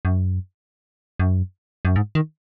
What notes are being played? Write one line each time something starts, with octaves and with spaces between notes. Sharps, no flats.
F#2
F#2
F#2
G#2
D#3